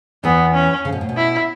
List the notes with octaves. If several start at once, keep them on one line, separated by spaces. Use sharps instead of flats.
E2 E3 B3
C#4
C#3
B2
A2
B2
E4